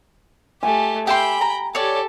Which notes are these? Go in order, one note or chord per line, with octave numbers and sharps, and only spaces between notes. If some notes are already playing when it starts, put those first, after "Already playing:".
A3 G4 G#5
G4 E5 G5 B5 C6
A#5
G4 A4 C#5 D5